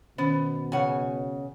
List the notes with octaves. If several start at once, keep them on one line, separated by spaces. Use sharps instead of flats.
B2 D#3 B3 C#4 C5
C#3 F#5 G#5